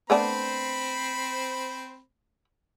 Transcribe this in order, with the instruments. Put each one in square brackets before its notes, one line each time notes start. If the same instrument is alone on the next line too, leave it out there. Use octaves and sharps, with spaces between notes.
[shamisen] A3 B3 D4 [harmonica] C4 C5 B5